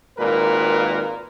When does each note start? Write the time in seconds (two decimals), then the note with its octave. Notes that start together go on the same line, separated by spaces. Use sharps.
0.18 G#1 A#2 A#4 B4